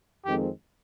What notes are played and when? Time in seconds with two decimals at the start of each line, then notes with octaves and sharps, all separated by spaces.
0.25 F2 D#3 G#3 C4 G4